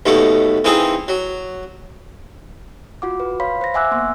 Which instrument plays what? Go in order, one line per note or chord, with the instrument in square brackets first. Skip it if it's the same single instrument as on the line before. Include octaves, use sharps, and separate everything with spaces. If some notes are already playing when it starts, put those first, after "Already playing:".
[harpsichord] D#2 B2 A3 A#3
E3 A#3 C4 D#4 G#4
F#3
[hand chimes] F4 F#4 F#5 D6
B4
C#5 F5 B5 C6 B6
C5 A#6
E5 F#5 G#5 D6 E6 F#6
A#3 B3 C6